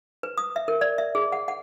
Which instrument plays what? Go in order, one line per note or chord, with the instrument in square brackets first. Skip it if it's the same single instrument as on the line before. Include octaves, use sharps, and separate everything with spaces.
[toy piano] B4
D#6
E5
A#4
D5
E5
G#4
F#5
F#5